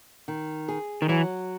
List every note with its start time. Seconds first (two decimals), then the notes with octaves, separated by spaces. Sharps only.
0.28 D#3
0.68 G#4
1.02 D#3
1.09 E3 F#3